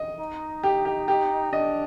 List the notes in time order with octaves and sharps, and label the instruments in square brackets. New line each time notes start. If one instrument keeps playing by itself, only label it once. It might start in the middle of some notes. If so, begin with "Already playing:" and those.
Already playing: [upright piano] D#5
[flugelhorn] D#4
[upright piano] G4
G4
G4
[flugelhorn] D4 [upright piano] D#5